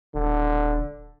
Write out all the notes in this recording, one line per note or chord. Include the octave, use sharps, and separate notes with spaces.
D#1 D3